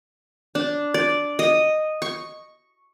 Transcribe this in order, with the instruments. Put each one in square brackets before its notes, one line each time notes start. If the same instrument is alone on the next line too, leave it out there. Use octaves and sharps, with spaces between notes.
[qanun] D4
D5
D#5
C#6